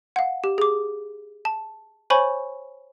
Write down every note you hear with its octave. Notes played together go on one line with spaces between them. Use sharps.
F5 F#5
G4
G#4 D6
A5
C5 C#5 G#5 B5 C#6